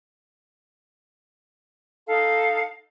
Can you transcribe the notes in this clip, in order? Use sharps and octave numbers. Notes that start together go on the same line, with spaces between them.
D#4 A4 F5